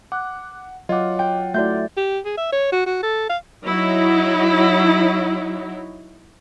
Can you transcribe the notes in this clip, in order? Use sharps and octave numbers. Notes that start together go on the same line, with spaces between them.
F#5 D6 F#6
F#3 F4 D#5 F#5 D6
G5
A3 E4 F#4 D5 E5 G6
G4
G#4
E5
C#5
F#4
F#4
A4
F5
F#3 D#4 E4